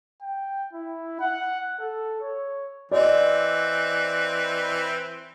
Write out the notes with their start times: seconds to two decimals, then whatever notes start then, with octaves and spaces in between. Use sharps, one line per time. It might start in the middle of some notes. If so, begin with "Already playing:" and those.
0.22 G5
0.73 E4
1.20 F#5
1.80 A4
2.21 C#5
2.91 E3 C4 D5 D#5